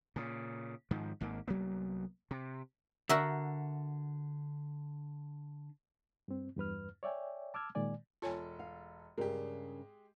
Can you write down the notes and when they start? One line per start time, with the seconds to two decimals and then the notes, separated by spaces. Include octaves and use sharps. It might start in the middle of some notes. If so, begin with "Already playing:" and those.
0.16 A#2 C#3
0.91 G#2 D#3 F3
1.20 G#1 G#2 A#3
1.48 C2 F#3 A#3 B3
2.31 C3
3.09 D3 F#4 A#4 E5
6.28 G2 C4
6.56 E2 G2 B4 F6
7.03 C#5 D5 E5 G5 G#5
7.54 A5 D6 E6 F6 G#6
7.75 A#2 D#3 G#3 D5 G#5
8.22 E1 F4 A4 C#5 G#5
8.59 F5
9.18 G2 C#3 G#3 G4 A#4